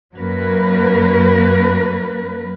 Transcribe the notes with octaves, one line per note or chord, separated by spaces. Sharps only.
F#2 F#3 A#3 A#4 B4